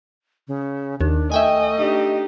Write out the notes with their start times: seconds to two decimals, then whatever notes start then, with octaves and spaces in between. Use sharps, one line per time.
0.48 C#3
1.01 D#2 D4
1.32 A3 D#5 E5 G5 G#5
1.76 D4 D#4 G4